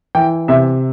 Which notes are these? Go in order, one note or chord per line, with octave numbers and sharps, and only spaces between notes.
E3 G5
C3 E5